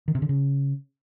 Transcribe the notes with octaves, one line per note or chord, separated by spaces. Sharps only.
D#3
C3
D3
C#3